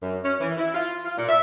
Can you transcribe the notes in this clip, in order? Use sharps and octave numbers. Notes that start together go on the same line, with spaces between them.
F#2
C#4
E3
E4
F4
F4
A#2
E5